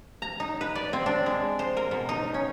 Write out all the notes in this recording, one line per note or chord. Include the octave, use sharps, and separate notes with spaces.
A#5
D#4
B4
D5
C4
D4
G#3
C5
A#4
B2
D#4
C#4